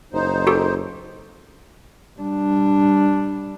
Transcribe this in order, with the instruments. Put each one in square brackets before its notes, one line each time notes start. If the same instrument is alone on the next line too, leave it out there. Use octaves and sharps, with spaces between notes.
[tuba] F#1 [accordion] D#4 C5
[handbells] F#4 G4 A4
[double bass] G3 D4